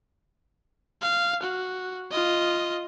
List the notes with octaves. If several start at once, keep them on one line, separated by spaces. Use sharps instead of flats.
F5
F#4
F4 D#5